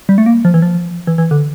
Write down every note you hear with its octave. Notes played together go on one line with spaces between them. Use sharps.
G3
A3
A#3
F3
E3
F3
E3
E3
D3